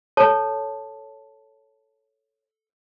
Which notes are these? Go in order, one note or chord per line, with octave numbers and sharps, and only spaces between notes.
A4 C#5 A5